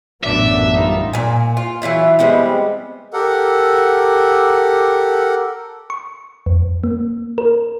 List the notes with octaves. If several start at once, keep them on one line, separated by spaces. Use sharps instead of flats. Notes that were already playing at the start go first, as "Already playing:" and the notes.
A1 F#2 B3 D4 D5 E5
G3 D#4 F4
A#2 G#5
F4
E3 F#3 E4 F4
G3 G#3 B3 C4
G4 A4 A#4 F#5
C#6
F2
A#3
A#4